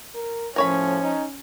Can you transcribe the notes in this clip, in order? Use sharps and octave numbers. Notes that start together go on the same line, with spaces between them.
A#4
A2 F3 C#4 A#4 C#5 B5
D#4